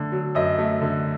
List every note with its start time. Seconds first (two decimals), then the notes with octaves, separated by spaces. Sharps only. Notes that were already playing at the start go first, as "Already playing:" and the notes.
Already playing: D3 A3
0.12 F#3
0.35 F#2 D#5
0.58 A3
0.82 D3